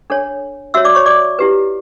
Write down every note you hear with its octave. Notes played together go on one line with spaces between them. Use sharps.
D4 A4 C#5
F#4 C#5 E5 E6
D5 D6
C#5 C#6
D5 D6
E4 G4 B4